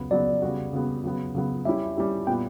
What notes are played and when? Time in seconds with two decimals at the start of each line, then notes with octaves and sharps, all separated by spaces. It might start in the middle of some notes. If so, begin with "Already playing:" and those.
Already playing: C#3 F#3 B3
0.11 C#3 F#3 B3 D5
0.42 C#3 G3 B3 F#4
0.73 C#3 G3 B3 F#4
1.04 C#3 F#3 B3
1.35 C#3 F#3 B3
1.65 G3 C#4 E4 G4 E5
1.97 G3 C#4 E4 G4
2.27 A#2 G3 B3 G5